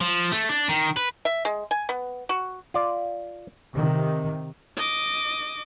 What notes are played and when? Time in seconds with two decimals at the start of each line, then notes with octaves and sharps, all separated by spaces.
0.01 F3
0.32 A3
0.49 D4
0.69 D#3
0.96 B4
1.25 E5
1.45 G#3
1.71 G#5
1.89 B3
2.29 F#4
2.74 F4 D5
3.74 C3 D#3
4.77 D#5 D6